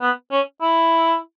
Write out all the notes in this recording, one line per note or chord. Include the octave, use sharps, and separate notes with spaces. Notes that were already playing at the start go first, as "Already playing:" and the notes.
B3
C#4
E4